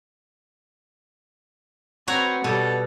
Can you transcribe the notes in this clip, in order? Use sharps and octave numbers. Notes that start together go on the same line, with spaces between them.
C4 F#4 B4 C#5 A#5
B2 G3 A4